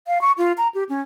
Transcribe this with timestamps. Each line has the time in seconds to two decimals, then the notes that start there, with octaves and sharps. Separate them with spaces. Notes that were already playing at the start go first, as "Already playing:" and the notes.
0.07 F5
0.21 C#6
0.38 F4
0.57 A#5
0.74 G4
0.89 C#4